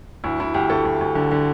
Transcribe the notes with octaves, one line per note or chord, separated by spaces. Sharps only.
D2 E4
D2 E4
D2 G4
D2 A4
D2
D2
D3
D3